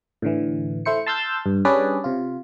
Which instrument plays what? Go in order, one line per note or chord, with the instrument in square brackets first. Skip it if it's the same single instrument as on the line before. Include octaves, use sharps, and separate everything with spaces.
[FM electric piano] A2 D3 E3
A3 E4 C5 C#7
A5 C6 E6 F6 G6 A6
G2
G3 C#4 D4 G#4 B4 D5
C3 F4